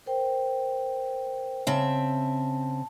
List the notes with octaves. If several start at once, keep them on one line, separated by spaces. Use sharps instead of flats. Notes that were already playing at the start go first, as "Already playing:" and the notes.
A#4 C5 G5
C#3 C4 E5 A5